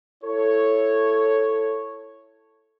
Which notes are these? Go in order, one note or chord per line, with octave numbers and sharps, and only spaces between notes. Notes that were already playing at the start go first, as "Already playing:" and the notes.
E4 A4 C#5